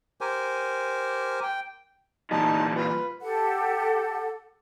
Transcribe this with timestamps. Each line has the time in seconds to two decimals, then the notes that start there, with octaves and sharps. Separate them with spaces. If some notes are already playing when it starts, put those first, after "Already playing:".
0.21 G4 A#4 C5 G#5
1.43 G5
2.31 A#2 E3 G3 D#4 A5
2.76 F4 B4
3.22 G4 A4 F#5